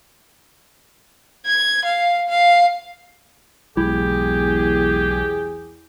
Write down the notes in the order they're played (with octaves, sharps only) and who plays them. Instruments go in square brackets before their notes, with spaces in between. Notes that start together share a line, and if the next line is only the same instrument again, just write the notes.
[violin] G#6
F5
F5
[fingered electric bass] B1 F#3 G#3 [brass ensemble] E2 G#4 [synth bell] E4 [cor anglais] G4